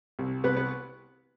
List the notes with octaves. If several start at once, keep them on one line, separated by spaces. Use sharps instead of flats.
C2
C2 B3 B4
B3 B4